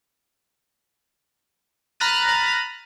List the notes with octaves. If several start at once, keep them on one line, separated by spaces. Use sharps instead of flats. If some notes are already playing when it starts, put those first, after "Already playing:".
A#5 B5 F6 F#6 A6 D#7